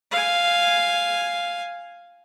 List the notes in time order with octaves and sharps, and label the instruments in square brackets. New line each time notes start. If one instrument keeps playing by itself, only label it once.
[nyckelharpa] F5 G#5